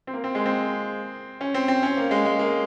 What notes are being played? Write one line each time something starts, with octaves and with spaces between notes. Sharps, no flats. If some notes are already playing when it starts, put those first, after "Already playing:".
C4
A#3
C4
G#3
C4
C#4
C4
C4
C#4
A#3
G#3
G#3
A#3